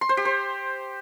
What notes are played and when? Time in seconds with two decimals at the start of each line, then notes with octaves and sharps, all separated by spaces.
0.01 C6
0.09 C5
0.17 G4
0.25 C5